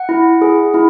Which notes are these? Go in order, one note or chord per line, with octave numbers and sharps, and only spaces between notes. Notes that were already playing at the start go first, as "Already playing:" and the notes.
Already playing: F#5
E4
G#4
E4